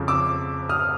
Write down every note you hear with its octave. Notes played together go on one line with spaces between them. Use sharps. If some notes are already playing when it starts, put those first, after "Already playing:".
Already playing: F2 C#3 F3
D6 E6
D#6 F6